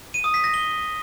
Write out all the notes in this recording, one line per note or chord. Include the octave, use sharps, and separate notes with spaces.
D#7
D#6
B6
A#6
G7